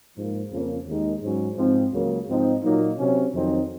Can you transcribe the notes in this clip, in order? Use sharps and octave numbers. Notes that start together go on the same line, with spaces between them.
G#2 F3 A#3
F2 C#3 F3 A#3 C#4
D#2 D#3 G#3 D#4
G#2 F#3 C#4
G#2 F3 C4
C#2 C#3 F#3 A#3
G#2 F3 C4 D#4
A#2 F#3 A#3 D#4
C3 F#3 C#4
F2 D#3 F#3 C4 D#4